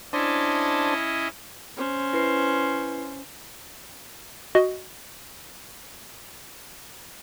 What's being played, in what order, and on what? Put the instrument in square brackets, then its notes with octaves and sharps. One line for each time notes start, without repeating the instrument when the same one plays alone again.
[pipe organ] C#4 E4 D#5 [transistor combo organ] D4 C5 A5
[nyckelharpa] C#4 C5
[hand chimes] E4 B4 C7
[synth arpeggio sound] F#4 D#5